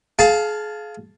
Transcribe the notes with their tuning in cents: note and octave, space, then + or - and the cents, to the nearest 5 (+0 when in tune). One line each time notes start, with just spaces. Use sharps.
G#4 +35 F5 +0 A5 +0